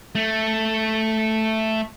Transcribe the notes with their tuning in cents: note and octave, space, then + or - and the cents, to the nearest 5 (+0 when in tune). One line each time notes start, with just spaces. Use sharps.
A3 +0